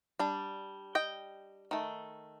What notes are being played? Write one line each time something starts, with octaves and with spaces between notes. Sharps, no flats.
G3 D4
D#5 G5
D#3 A3